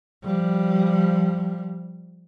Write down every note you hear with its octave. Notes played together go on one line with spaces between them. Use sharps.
F3 G3